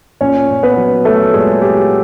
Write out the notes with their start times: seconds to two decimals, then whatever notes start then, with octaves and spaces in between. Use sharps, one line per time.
0.21 A#2 C#4 C#5
0.49 A#2
0.63 B3 B4
0.77 F#3
1.05 F#3 A3 A4
1.34 A#2 G#3 G#4
1.62 A#2 G4